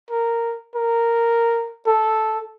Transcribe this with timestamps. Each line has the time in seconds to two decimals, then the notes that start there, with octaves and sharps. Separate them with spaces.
0.11 A#4
0.75 A#4
1.86 A4